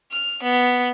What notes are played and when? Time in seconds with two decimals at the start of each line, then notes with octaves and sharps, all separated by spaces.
0.11 F6
0.43 B3